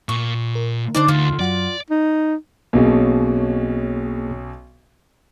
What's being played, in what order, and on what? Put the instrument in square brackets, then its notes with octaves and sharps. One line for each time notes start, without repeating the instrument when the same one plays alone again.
[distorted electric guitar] A#2 [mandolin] C#6
[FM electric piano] A#4
[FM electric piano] D3 D#4 [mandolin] D4 C5 D5
[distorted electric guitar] D2 [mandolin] F4
[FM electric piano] F#2 F#3 F#5 [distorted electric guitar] D5
[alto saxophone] D#4
[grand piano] B1 B2 C#4 [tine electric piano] A#3 C4 G#4